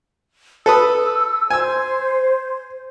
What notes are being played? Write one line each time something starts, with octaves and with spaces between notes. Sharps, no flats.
A4 B4 D#6 E6
C5 G#5 E6